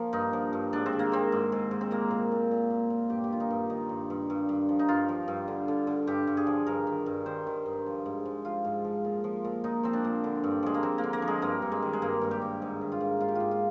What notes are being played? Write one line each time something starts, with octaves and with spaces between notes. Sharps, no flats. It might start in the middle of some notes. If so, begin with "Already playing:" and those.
Already playing: F3 A#3
G2 D#4
F3
G2
G#2 D4
C4
D#3
A#3
D#3 C4
G#2
G#2
G#2
C4
A#2 A#3
A#2
A#2
A#2
A#2
A#2
G2 G4
G4
D#3 F4
D#4
G2
D#3 D#4
G2
G2
G2
G2
F3
D#4
G2 F4
F3
G2
D3
D3
D3
G2 G4
G2
G#4
F3
G2 A#4
D#3
G2
D#3 C5
D#3
G2
F3
G#2
G#2
F3 F4
G#2
F3
A#2
F3
A#2
A#2 D#4
F3 C4
D4
A#2
D3
G2
F3 G#3
A#3
F3 C4
A#3
D3
A#3
F3
G#3
G2 A#3
G2
G#3
D#3
G#3
G2 A#3
G2
G4
G2
G#2
D#3
F4
G#2
G#2 F4
G4
G#2 F4
F4